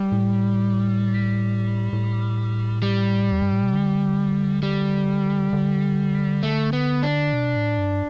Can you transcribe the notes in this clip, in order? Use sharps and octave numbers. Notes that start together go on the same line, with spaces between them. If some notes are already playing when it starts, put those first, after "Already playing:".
Already playing: G3
A2
A2
G3
E2
G2
A2
B2
D3
G3
D3
A3
B3
D4
B2
A2
G2